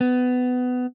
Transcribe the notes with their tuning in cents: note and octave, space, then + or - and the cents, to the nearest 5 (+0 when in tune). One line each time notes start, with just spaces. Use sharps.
B3 +20